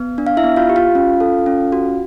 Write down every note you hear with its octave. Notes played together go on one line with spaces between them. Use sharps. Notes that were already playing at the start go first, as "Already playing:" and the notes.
Already playing: B3
D4
F5
E4 E5
B3
F4 F5
G4
F4 F5
C#4
A4
C#4
F#4